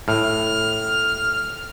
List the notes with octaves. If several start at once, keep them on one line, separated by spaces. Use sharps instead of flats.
A2 F6